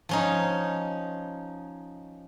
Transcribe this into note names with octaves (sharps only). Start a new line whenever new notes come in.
F3 C#4 D#4